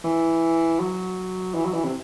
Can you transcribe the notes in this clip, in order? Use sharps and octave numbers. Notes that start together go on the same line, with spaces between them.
E3
F#3
E3
F#3
E3
C3